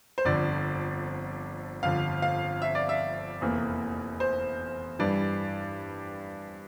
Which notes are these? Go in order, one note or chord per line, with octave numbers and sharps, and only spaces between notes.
C5
G1 F2 D3 D5
G1 F2 D3 F5
F5
E5
D5
E5
F1 E2 E3 A#3
C5
G2 E3 G3 D4 D5